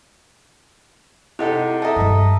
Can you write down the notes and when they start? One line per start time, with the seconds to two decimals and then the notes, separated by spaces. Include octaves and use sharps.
1.39 C3 D#4 E4 A4 F#5
1.82 A4 D#5 E5 A5 A#5
1.96 G2 G3